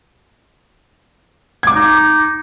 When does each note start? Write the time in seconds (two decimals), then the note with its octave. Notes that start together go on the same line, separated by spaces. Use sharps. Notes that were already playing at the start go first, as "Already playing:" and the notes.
1.63 D6 G#6
1.75 D#4